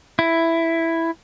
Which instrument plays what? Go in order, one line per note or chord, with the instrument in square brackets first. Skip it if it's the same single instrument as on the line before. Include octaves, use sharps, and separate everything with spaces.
[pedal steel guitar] E4